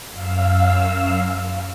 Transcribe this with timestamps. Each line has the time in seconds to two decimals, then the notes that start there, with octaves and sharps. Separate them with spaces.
0.12 F#2 F5 E6